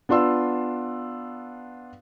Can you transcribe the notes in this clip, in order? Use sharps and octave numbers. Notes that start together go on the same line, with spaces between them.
B3 D4 F4 C6 E6